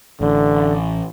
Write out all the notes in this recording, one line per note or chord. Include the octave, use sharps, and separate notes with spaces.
A1 D3